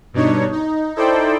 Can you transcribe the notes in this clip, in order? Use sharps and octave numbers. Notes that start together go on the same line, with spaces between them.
G2 B2 D4 D#4 C#5
D#4
D#4 E4 A4 C5 D5 G5